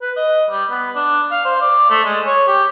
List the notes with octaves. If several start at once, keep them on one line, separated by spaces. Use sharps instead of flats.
B4
D#5
G3
B3
D4
F5
C5
D5
A3
G#3
C#5
G4